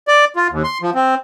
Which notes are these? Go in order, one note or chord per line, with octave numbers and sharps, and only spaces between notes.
D5
F4
D#2
C6
F3
C4